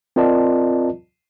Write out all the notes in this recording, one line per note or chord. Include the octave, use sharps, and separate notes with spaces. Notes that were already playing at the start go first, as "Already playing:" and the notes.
C4 F4 A#4 D5 D#5 A5